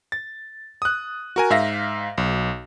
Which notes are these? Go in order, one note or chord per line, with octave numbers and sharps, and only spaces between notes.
A6
D#6 F#6
F#4 A#4 G#5
G#2 E5 F5 A#6
B1